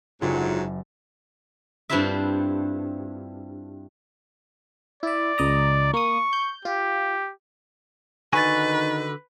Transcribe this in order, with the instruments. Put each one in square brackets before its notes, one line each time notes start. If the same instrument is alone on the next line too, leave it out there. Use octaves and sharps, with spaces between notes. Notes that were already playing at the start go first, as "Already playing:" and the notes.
[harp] F#1 E4 G4 [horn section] G#2 D3 F#3 [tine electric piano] F4
[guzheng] G2 C4 D4 E4 F4 E5
[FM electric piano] E4 E5 [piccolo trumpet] D5
[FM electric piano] C#2 D#5 A#5
[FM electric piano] A#3 D#6 [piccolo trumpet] C#6
[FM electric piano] G6
[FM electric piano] F4 [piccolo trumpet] G4
[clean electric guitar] D3 F#4 G#5 [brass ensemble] D#3 D#4 [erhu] B4 [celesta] C#6 A6